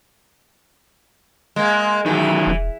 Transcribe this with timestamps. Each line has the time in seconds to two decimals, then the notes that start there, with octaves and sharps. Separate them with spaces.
1.56 G#3 A#3
2.06 D#3 E3 F#3
2.47 E1